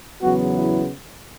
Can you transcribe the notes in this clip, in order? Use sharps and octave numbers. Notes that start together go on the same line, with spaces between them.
E2 C#3 F#3 B3 F#4
E4